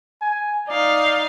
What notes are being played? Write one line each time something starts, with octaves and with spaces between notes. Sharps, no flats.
G#5
D#4 D5 F5